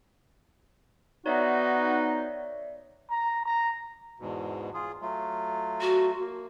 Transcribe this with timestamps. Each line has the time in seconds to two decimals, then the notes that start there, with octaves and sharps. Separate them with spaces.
1.26 B3 D#4 F#4 C#5 D5 E5
3.10 A#5
3.45 A#5
4.20 E2 G#2 B2
4.74 F4 G#4
5.01 F#3 A3 F4
5.81 F#4
6.20 A#3